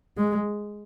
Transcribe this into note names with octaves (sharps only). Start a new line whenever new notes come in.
G#3